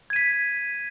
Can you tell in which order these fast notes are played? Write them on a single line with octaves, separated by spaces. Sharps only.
G#6 D#7 B6